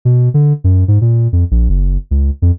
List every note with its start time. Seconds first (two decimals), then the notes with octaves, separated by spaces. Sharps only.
0.05 B2
0.34 D3
0.64 F#2
0.88 G#2
1.01 A#2
1.33 F2
1.51 A#1
1.69 F#1
2.11 C#2
2.42 F2